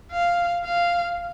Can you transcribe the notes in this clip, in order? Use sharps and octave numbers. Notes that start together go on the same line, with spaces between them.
F5
F5